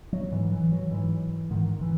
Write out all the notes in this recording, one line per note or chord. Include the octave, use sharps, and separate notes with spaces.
F#3
G#2 E3
E3
F#3
G#2 E3
G#2 D#3
E3